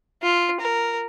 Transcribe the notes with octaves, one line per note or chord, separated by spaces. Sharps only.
F4
A#4